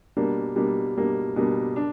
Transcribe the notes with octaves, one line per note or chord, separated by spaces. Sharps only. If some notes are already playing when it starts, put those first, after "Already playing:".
B2 G3 A#3 D4
B2 G3 A#3 D4
B2 G3 A#3 D4
B2 G3 A#3 D4
D4